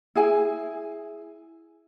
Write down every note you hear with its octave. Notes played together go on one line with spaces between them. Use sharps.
E4 G#4 G#5